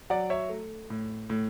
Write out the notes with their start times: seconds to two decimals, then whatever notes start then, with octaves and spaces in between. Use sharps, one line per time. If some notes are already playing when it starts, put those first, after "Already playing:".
0.10 F#3 D5 F#5
0.30 C#5 E5
0.49 A3
0.90 A2
1.30 A2